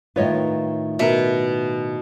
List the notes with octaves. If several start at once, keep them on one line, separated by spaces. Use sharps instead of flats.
A2 D#3 F4 B4 C#5 D#5
B2 A#4 E5